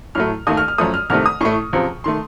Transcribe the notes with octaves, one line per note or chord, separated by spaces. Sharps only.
A2 F#3 A3 F6
D#2 D#3 A3 D#6
F6
F6
F#2 F3 A3 D#6
F6
C2 C3 D#3 A3 F6
D#6
A2 A3 C#6
C#2 C3 F3
D#3 A3 C6